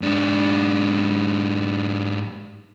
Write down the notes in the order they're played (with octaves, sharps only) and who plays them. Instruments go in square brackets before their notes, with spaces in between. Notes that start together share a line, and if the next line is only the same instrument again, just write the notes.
[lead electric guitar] G#2 D4